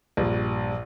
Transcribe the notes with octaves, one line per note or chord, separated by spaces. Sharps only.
A#1 G2